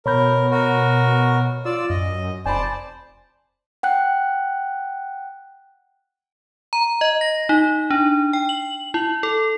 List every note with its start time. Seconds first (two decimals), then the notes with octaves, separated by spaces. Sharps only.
0.06 B2 A#4 C#5 B5 G6
0.51 F#4 A#4
1.65 F4 D5 E6
1.90 F#2 D#5
2.46 F1 C5 D5 G#5 A5 B5
3.83 F#5 G5 F#6
6.73 A#5
7.01 D#5
7.21 A#6
7.49 D#4
7.90 D4
8.33 G5
8.49 F#7
8.94 E4
9.23 A4